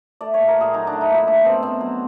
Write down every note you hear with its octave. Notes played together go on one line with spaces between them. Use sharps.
A3 D5
A#2 C#5
A#4
A#2 G#4
F#3 D#4
D4
A3
D#4
A#2 E4
A3 D4
B2 C4
B2 C4
F#3